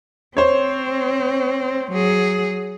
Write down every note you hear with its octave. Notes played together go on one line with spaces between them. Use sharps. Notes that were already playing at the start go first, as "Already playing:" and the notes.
C4 C5 C#5
F#3 G#4